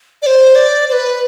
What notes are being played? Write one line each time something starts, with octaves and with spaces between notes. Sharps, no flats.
D5
C5
D5
C5
B4